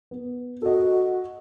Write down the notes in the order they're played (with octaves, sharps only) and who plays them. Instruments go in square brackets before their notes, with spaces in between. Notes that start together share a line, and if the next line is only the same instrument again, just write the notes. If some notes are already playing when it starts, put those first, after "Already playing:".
[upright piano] B3
[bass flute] F#4 [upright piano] A4 D#5